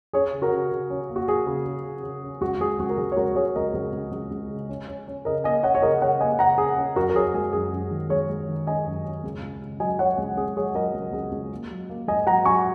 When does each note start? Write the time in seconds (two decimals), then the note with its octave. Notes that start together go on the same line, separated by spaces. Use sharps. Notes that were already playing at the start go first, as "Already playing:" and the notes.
0.13 C#4 G#4 C#5
0.33 C#3
0.42 F#4 A#4
0.52 C#3
0.71 C#3
0.90 C#4
1.09 A#3
1.16 F#4
1.28 A#3 G#4
1.47 C#3
1.66 C#4
1.85 C#3
2.03 C#3
2.23 C#4
2.41 C#2 F#4
2.60 C#2 G#4
2.79 C#2 F#4
2.90 A#4
2.98 C#2 G#4
3.12 C#5
3.17 C#2 F#4 A#4
3.36 C#2 G#4 C#5
3.56 C#2 A#4 D#5
3.74 C#2
3.93 C#2
4.12 C#2
4.31 C#2
4.49 C#3
4.69 C#4
4.88 C#4
5.07 C#4
5.25 C#3 A#4 D#5
5.44 A#3 D#5 G#5
5.63 C#4 C#5 F#5
5.75 C#5
5.82 C#3 A#4 D#5
6.01 C#3 C#5 F#5
6.20 A#3 D#5 G#5
6.39 C#3 F#5 A#5
6.58 C#3 G#4
6.78 C#4
6.96 F#2 F#4 A#4
7.09 A#4
7.15 F#2 G#4 C#5
7.34 G#3 G#4
7.53 F#2 G#4
7.73 F#2
7.91 D#3
8.09 G#3 G#4 C#5
8.29 G#3
8.49 D#3
8.67 C#4 D#5 G#5
8.86 F#2
9.05 C#4
9.24 C#2
9.43 C#2
9.62 C#3
9.80 F#3 D#5 G#5
9.99 F#3 C#5 F#5
10.18 C#2
10.37 C#2 G#4
10.56 F#3 G#4 C#5
10.75 F#3 A#4 D#5
10.94 C#2
11.13 C#2
11.32 C#2
11.52 A#3
11.71 F#3
11.90 A#3
12.08 G#2 D#5 G#5
12.26 F#3 F#5 A#5
12.45 F#3 G#5 C#6